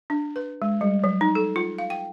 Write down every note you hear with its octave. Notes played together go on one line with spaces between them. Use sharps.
D4
B4
G#3
G3
F#3
D#4
A4
F4
F5
G5